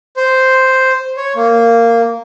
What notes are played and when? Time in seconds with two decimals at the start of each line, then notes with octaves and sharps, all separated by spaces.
0.17 C5
1.17 C#5
1.36 A#3